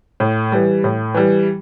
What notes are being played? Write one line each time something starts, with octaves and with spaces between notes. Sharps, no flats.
A2
E3 G3
A2
E3 G3